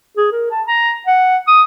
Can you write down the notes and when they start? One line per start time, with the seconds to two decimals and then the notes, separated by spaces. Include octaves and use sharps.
0.17 G#4
0.32 A#4
0.51 A5
0.67 A#5
1.07 F#5
1.47 D#6